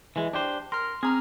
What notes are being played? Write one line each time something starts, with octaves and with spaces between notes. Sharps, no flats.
E3 G#3
D4 G4 C5
A#4 C6 F6
C4 G#4 A#5 F6